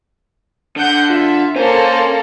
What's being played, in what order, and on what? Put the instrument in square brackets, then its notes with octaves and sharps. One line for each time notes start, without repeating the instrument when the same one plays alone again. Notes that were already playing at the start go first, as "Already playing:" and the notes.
[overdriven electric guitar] D3 [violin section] F#5 G6
[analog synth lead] F4 [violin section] E5
[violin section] A#3 A4 [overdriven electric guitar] C#4 [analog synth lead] C5